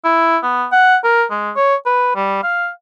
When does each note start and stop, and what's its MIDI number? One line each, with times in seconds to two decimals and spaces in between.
0.04 0.37 64
0.43 0.65 59
0.72 0.96 78
1.04 1.24 70
1.30 1.51 56
1.56 1.75 73
1.86 2.12 71
2.16 2.42 55
2.43 2.69 77